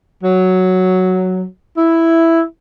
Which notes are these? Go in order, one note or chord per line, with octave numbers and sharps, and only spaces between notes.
F#3
E4